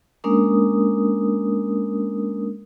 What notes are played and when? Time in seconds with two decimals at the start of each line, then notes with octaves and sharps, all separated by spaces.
0.24 G#3 A#3 C#4 D4 A#4 D#6